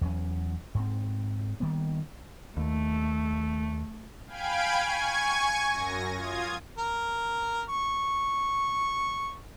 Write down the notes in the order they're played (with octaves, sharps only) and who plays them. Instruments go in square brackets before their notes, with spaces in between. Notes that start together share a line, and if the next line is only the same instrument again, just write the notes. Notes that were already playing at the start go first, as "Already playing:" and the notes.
[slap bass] E2 G2 F#3 C#4
G#2 C4
D#3 G3 A#3 B3
[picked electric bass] D#2 [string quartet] A3
[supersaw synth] F5 G5 G#5 B5 G#6 D7
G#5 C#6 G#6
F#2 A#6
F4 D#6 G#6
[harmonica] A#4
C#6